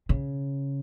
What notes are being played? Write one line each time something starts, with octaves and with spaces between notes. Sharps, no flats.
C#3